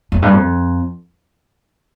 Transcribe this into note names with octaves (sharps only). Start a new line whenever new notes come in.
F2
G2
F2